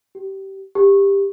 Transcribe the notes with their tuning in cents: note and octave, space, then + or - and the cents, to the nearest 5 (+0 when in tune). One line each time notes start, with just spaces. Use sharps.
G4 -20
G4 +15